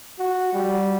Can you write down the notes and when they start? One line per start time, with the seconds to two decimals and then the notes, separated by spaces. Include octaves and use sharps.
0.19 F#4
0.53 G3